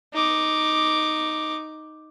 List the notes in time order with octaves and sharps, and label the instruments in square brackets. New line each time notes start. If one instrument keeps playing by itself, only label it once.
[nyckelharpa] D#4 D6